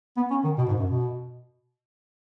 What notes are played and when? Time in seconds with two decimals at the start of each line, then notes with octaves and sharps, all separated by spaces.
0.17 B3
0.30 C#4
0.44 D#3
0.58 B2
0.68 G#2
0.79 F#2
0.90 B2